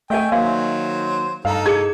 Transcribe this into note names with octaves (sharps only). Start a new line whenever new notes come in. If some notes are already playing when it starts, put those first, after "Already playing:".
A3 A#4 D#5 E5 G5 G#5 C#6 E6
D#3 F#3 A#3 C5 D5 F5 C6
G2 D#4 A4 F5 A#5
E4 G#4 A#4 G#6 C#7